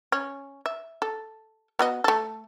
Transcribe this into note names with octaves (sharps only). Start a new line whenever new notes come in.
C#4
E5
A4
B3 F#4 D#5
A3 A4